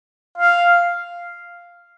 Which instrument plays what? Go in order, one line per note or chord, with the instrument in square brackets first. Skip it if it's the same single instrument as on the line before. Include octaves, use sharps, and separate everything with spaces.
[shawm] F5